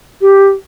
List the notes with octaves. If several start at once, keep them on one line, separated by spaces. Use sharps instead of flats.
G4